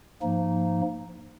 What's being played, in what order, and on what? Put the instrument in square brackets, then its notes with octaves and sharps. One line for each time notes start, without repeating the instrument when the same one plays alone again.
[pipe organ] G#2 F3 A#3 D#4